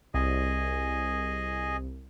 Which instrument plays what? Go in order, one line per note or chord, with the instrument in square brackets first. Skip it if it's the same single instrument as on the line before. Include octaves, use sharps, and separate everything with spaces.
[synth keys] C2 [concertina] G#4 D#5 G#5